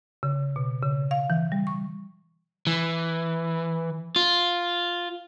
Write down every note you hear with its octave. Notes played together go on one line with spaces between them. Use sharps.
C#3
B2
C#3
F5
E3
G3
C#6
E3
F4